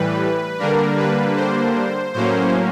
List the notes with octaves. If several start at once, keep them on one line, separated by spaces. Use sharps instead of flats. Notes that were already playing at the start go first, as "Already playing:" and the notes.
Already playing: A2 E3 G3 B4
D3 G3 A#3 D4 A#4
B4
C5
A2 F#3 A#3 C#4 C5